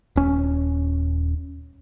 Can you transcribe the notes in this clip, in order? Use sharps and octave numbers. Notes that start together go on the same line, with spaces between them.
D#1 C#4